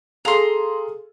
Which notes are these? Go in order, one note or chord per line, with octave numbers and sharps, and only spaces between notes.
G#4 A4 F5 A#5 C6